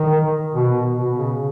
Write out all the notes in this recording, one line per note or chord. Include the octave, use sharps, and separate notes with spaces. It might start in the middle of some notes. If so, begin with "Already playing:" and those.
Already playing: D#3
B2
B2
C#3